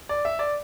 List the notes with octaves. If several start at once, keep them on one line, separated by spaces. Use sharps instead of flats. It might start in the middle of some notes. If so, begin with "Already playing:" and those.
D5
E5
D5